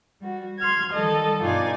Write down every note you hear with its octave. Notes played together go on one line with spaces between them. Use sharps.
G3 F#4
C6 F6 G#6
D#3 G3 A4 D#5
G2 B2 D#4 F4 D5 G#5